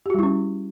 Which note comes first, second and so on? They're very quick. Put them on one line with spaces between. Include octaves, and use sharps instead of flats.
G4 F#4 G3 E4 C#4